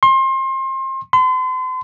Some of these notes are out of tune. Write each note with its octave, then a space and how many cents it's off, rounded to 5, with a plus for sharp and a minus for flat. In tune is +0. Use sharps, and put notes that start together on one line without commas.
C6 +30
C6 -40